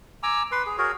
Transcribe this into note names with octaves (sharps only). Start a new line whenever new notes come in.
G#5 A#5 D6 E6
B4 C6
G#4
F#4 G#4 A#4 C#5